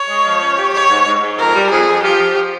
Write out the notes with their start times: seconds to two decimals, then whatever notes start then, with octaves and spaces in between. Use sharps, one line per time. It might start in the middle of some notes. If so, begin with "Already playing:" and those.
Already playing: C#5
0.10 G#3
0.25 F3
0.42 C#4
0.58 G4
0.73 G#2 C#5
0.90 G#2
1.06 G#2
1.22 G#2
1.38 F2 A#4
1.55 G3
1.70 F2 G#4
1.87 F2
2.03 F3 G4
2.19 F3
2.36 F3